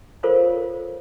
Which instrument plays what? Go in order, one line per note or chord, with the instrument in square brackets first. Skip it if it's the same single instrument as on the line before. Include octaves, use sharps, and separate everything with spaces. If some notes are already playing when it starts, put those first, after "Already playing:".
[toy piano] F4 A4 A#4 C5 C#5 F5